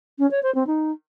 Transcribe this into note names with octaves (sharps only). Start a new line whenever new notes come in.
C#4
C#5
C5
C4
D#4